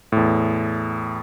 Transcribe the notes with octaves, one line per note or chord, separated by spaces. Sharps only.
E2 A2